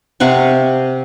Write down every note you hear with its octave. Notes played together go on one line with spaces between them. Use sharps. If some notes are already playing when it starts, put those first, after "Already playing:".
C3 F5 F#5 C#6